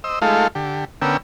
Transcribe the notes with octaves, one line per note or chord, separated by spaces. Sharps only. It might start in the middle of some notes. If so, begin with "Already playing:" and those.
C5 D#5 E6
G#3 A3 D#4 F4 A4 F5
D3 G4
D3 B3 C#4 A#4 G5 E6